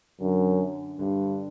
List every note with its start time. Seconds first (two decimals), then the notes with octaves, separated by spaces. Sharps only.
0.20 F#2 D3
0.99 G2 D3